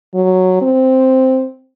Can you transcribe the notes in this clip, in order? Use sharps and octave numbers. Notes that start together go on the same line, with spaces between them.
F#3
C4